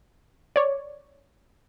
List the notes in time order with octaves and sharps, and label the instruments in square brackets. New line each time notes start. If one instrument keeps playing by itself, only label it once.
[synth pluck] C#5 D5